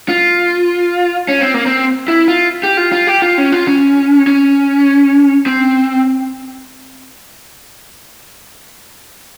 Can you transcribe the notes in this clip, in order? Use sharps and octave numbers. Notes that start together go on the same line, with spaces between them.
F4
C#4
C4
A#3
C4
E4
F4
G4
F4
F4
G4
F4
C#4
F4
C#4
C#4
C4